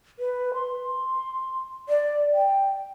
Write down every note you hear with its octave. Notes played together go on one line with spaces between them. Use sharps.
B4
C6
D5
G5